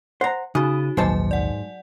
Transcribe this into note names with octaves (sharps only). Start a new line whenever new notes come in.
C5 F#5 A#5
C#3 D#4 F#4 D#6
A#1 D#2 G#2 F#3 C5 G#5 A5
D5 F#5